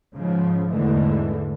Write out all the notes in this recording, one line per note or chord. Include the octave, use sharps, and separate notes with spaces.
G#2 C#3 F3
E2 G#2 D3 E3 G#3 A3